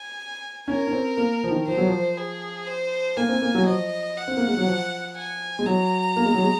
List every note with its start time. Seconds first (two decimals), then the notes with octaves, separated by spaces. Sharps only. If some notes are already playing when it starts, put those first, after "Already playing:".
Already playing: G#5
0.68 C#4 A#4
0.87 C#4
0.93 C4
1.17 A#3
1.44 F3
1.51 D#3
1.67 F3 C5
1.77 F#3
1.87 F3
2.17 G#4
2.67 C5
3.17 A#3 G#5
3.29 C4
3.42 A#3
3.55 F#3
3.67 F3 D#5
4.17 F#5
4.28 C4
4.37 A#3
4.48 G#3
4.57 F#3
4.67 F3
5.17 G#5
5.59 G#3
5.66 F#3 A#5
6.16 A#3
6.25 G#3
6.34 F#3
6.43 G#3